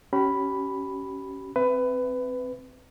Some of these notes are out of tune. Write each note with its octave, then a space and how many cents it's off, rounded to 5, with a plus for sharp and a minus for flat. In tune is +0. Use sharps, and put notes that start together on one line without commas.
C#4 +0 G4 -40 B5 +0
C4 +0 B4 +20 E5 +25